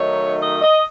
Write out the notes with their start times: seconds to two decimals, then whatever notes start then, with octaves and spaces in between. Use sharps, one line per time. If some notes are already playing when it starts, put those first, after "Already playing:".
Already playing: D#3 F#3 A3 D#4 C#5
0.41 D#5
0.62 D#5